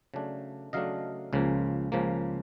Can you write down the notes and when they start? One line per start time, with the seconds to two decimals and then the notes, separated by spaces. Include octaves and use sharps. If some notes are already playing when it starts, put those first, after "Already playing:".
0.14 C#3 F#3 A3 D4
0.73 C#3 F#3 A3 D4 D#5 F5
1.33 C#2 C#3 F3 A#3
1.92 C#2 C#3 F3 A#3